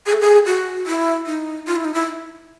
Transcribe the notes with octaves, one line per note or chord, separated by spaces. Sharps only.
G#4
A4
G#4
F#4
E4
D#4
F4
E4
D#4
E4